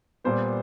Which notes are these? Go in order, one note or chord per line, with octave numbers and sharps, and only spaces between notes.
A#2 G3 B3 C5